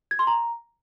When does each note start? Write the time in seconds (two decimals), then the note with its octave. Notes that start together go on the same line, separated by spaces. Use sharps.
0.11 G#6
0.19 C6
0.27 A#5